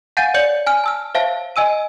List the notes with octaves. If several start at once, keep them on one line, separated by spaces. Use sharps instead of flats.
F5 F#5 G#5 G6 A6 D#7
C#5 D5 G6 C#7 F#7
G#5 F6
A5 E6 F6
C5 C#5 E5 F5 A5
D#5 G#5 E6 D#7